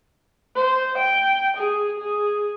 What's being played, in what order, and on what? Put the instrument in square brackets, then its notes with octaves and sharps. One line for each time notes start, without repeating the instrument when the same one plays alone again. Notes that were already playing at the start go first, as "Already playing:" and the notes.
[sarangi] C5
G5
G#4
G#4